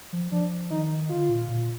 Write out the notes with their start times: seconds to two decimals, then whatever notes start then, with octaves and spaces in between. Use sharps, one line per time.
0.13 F3
0.32 F3 D4
0.71 D#3 D#4
1.10 D3 F4
1.29 A#2
1.49 A#2